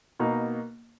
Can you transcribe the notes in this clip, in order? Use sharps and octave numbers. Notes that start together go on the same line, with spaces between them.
B2 A#3 D#4